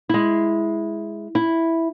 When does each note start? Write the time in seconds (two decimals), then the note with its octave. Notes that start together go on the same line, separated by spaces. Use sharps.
0.09 G#3 E4
1.35 E4